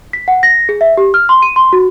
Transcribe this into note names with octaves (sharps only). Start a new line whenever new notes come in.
B6
F#5
A#6
G#4
E5
G4
F6
C6
D#7
C6
F#4